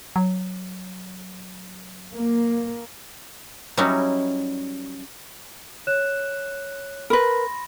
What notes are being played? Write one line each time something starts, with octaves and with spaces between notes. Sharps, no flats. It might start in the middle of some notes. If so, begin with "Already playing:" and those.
F#3
A#3
F#3 G3 C#4 D#4 E4 F#4
C#5 F#6 E7
A#4 B4 B5 C6 A#6